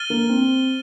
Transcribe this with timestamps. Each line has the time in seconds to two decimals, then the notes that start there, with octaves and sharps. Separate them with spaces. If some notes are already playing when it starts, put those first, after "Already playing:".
Already playing: F6 A6 D#7 G7
0.10 A#3
0.29 C4